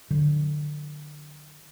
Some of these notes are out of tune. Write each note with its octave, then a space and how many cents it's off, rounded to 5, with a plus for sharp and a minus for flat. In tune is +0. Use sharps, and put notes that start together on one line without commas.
D3 +20 F#3 -30